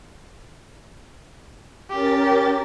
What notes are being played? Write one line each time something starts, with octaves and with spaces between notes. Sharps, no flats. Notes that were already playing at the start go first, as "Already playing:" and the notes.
C#4 G4 A#4 A6